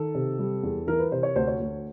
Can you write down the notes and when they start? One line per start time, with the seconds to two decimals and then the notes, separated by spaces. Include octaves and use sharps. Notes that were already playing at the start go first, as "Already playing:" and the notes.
Already playing: D#3 A4
0.15 C3
0.39 G3
0.63 E2
0.87 E3 A#4
0.99 B4
1.11 C3 C5
1.23 C#5
1.36 D2 C5
1.47 C#5
1.59 D2